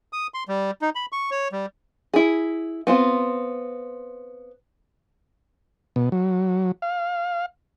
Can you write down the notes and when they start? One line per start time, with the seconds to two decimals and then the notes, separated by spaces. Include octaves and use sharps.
0.13 D#6
0.34 C6
0.48 G3
0.82 D#4
0.95 B5
1.12 C#6
1.31 C#5
1.52 G3
2.14 E4 G#4
2.87 B3 C4 F4
5.96 B2
6.12 F#3
6.82 F5